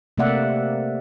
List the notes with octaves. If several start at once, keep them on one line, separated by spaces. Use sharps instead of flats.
C3 A3 A#3 D5 E5 F#5